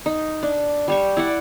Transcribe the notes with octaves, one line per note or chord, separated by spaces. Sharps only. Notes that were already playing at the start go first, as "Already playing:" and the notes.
D#4
D4
G3 G4 C#6
E4 D5 F#5